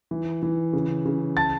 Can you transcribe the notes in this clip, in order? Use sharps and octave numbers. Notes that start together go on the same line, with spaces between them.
E3
E3
C#3
C#3
A5 A6